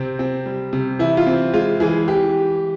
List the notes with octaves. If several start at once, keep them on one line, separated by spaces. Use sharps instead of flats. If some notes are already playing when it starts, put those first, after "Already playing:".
Already playing: C3 C4
C4
G3
C3
E3 E4
F4
C4
G#3 F4
E3 G#4
E3 G4